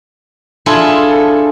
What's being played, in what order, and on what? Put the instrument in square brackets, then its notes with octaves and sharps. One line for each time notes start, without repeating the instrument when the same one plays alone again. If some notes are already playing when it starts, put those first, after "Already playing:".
[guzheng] D4 E4 F4 G#4 A4